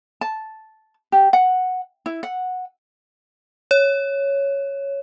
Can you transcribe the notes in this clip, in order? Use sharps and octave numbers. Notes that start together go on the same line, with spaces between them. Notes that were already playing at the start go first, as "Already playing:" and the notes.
A5
G4
F#5
E4
F#5
C#5